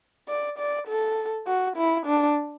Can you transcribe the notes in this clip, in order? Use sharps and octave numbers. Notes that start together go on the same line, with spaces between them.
D5
D5
A4
F#4
E4
D4